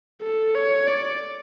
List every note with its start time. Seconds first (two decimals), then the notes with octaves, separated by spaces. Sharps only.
0.22 A4
0.55 C#5
0.87 D5